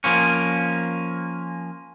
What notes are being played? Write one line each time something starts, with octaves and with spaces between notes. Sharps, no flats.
F3 A#3 C#4